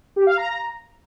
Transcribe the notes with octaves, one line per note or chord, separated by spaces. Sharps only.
G4
F5
A#5